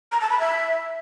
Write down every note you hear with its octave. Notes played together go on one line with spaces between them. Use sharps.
A#5
A5
B5
E5